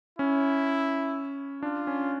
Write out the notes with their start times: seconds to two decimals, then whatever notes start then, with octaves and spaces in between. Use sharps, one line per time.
0.19 C#4 E4
1.63 D4 F4
1.87 C#4